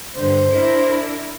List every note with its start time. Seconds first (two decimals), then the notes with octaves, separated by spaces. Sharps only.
0.15 G2 D3 C5
0.50 D4 E4 A#4